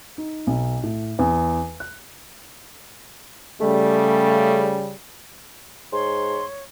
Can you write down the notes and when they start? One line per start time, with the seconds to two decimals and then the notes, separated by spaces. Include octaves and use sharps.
0.18 D#4
0.47 B1
0.83 A2
1.19 E2
1.80 F#6
3.61 C#3 G3 A3
5.92 G#2 C#5 C6